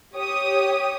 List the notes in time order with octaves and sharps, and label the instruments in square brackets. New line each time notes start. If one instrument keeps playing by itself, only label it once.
[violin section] G4 C#5 D#6